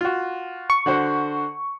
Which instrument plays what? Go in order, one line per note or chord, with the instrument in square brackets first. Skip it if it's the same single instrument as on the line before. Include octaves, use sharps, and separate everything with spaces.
[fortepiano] F4 F#4
[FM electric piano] C#6
[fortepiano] D3 F#4 C5